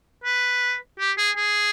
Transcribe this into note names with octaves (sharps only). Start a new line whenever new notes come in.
B4
G4
G#4
G#4